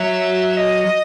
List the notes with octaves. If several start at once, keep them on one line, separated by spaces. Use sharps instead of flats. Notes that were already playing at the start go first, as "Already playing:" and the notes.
Already playing: F#3 E5
D#5